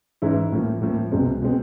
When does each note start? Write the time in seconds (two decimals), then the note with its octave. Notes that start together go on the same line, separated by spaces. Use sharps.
0.22 G#2 E3 G#3 C#4 E4
0.52 A2 F3 A#3
0.82 A2 F3 A#3
1.12 C2 B2 G#3 C4
1.42 B2 G#3 C4